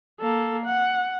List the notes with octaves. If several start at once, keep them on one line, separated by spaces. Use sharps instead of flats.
A#3 A4
F#5